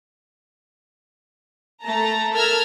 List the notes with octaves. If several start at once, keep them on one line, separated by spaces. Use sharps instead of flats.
A3 A5 A#5
A4 A#4 A#5 E6 F6 G#6